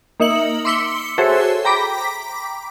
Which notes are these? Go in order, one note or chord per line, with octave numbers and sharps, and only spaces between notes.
A#3 D#4 E5 C#7 F#7
C6 D6 E6 B6 C#7 G7
F#4 G#4 A4 C5 C#5 E5
G5 A#5 B5 D6 B6